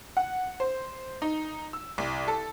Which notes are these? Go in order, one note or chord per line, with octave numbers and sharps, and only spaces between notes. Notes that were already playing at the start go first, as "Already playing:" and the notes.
F#5
C5
D#4
E6
C2
A4